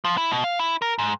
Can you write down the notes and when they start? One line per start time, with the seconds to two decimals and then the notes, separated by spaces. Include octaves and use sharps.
0.04 F3
0.17 E4
0.31 B2
0.44 F5
0.59 E4
0.82 A#4
0.99 G#2